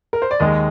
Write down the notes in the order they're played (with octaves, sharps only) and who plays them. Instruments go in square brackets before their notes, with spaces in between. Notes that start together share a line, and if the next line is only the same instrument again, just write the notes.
[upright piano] A#4
C5
D5
D#2 D#3 G#3 D#5